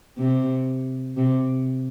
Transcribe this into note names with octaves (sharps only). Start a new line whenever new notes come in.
C3
C3